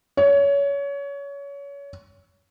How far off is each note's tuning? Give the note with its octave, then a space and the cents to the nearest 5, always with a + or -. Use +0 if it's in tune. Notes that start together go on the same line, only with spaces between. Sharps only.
C#5 +25